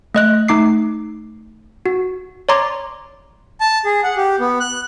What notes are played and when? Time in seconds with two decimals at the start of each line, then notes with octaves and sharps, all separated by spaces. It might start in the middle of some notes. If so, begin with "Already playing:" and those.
0.15 A3 D#5 F#6
0.48 A3 D#4 D6 C7
1.86 F#4
2.49 C#5 D5 A#5 C6 D6
3.61 A5
3.85 G#4
4.04 F#5
4.17 G4
4.40 B3
4.60 F#6